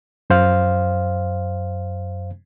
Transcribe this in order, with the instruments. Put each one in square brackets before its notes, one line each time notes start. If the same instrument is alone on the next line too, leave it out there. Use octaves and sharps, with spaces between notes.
[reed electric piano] F#2 C5 F5